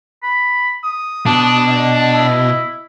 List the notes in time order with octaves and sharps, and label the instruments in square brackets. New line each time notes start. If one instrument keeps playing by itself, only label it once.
[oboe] B5
D#6
[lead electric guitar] B2 [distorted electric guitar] D4
[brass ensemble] D#5
[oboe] E4